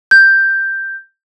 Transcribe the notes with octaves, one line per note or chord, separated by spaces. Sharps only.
G6